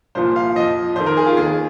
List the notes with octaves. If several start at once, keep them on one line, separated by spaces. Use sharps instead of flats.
C2 A#2 F3 C5
F5
F2 F3 D#5
F2 D#3 C5
A#4
G#4
F4
D#2 D#3 G#4